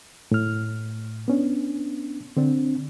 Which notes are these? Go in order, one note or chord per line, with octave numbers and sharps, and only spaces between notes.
A2 F6
B3 C#4 D4
D3 C4 D4